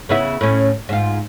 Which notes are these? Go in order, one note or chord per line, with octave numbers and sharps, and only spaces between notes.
C#3 B3 E4
A2 C#4
G#2 F4